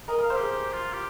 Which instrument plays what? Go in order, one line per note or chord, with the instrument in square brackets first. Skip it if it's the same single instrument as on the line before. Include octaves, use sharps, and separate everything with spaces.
[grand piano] A#4 [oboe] D#5
[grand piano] A#4
[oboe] F5
[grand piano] C5
[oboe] G4 [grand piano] G#4
[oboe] G4
F4
G4